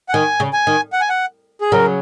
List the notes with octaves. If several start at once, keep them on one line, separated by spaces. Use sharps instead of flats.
F#5
D#3 G#5
C#3
G#5
D#3
F#5
G#5
F#5
G#4
C#3 F#3 A#4